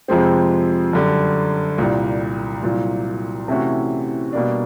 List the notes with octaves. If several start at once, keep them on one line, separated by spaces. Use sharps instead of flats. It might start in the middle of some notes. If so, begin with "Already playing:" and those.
F2 C3 F3 G#3 C4
F#2 D3 G3
C2 A#2 G3
C2 A#2 F#3
C3 E3 A3 C#4 F#4
B2 G3 A#3 D4